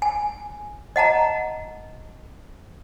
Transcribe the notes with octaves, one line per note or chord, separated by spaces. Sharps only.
G#5
D#5 F#5 A5 A#5